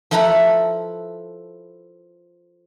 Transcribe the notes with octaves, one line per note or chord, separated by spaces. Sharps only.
F3 E4 A4 B4 A#5 B5